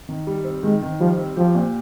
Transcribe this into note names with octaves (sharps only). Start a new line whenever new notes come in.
D#3
G3
C4
D#3 G#3
D#3
F3 G3
C4
F3 G4
A#2